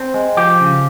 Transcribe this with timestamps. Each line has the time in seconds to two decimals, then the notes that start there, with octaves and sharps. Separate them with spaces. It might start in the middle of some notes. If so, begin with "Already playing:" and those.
Already playing: C4
0.14 G#3
0.37 F3 G4
0.61 C#3